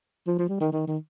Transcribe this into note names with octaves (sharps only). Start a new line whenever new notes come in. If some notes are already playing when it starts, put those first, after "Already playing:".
F3
F3
G3
D#3
D#3
D#3